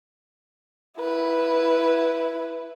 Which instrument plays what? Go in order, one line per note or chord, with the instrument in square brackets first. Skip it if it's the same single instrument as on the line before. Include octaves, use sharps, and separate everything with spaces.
[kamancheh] E4 B4